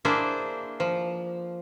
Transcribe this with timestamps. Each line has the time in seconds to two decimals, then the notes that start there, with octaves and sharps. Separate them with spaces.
0.05 A#3 D4 E4 G#4 C5
0.80 F3